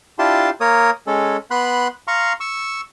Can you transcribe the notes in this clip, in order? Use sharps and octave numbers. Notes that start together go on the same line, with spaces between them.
D4 E4 F4 G4 A5 C6
A#3 A#4 C#5 D#6
G#3 C#4 A4
B3 B5 C6 F#6
F5 A#5 C6 C#6
C#6 E6